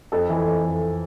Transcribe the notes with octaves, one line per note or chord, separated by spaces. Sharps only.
F2 A4
E3
F2
F2